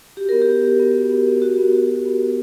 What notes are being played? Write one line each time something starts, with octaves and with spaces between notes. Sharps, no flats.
F#4 G4
B3 A#4
G4
B3
B3
B3
F#4
B3
B3
B3 F#4
B3
F#4
B3
B3
F#4